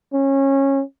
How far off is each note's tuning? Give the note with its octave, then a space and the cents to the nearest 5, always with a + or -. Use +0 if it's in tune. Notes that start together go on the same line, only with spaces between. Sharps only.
C#4 -20